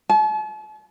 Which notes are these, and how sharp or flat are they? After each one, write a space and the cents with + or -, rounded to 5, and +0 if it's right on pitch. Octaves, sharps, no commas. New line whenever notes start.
A5 -45